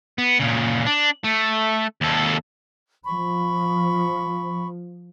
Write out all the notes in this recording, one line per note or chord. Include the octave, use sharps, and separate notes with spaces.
B3
A#2 C#3
D4
A3
D#2 A4
F3 B5 C#6